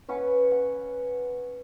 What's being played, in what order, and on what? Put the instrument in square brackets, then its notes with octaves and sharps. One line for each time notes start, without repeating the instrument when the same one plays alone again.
[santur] C#4 B4 F#5
F#5